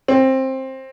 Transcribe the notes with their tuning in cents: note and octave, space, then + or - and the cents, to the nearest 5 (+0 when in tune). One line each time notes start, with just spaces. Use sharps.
C4 +15